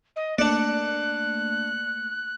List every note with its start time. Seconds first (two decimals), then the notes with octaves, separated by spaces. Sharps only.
0.16 D#5
0.38 A3 A#3 D4 D5 F#6 C#7